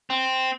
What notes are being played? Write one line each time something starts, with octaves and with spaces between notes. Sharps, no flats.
C4